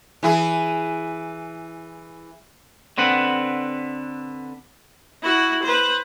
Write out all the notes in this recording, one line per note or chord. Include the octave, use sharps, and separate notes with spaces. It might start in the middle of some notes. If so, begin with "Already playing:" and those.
E3 E4 G#4
D3 C4 B4 F#5
E4 F#4
B4 C5